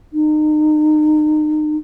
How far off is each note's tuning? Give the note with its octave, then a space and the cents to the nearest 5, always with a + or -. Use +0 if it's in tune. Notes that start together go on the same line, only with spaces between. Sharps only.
D#4 -30